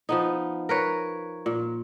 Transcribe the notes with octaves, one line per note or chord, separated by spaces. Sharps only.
F3 B3 D#4
A#4 B4 C#5
A#2